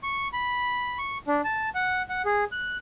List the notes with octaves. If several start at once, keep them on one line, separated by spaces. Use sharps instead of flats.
C#6
B5
C#6
D4
A5
F#5
F#5
G#4
F#6